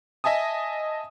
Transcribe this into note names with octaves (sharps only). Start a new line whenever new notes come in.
D#5 E5 G#5 A5 D#6